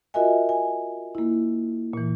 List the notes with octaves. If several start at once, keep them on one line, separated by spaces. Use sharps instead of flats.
F4 F#4 A#4 D#5 E5 G#5
G#5
A#3 E4
A#2 E3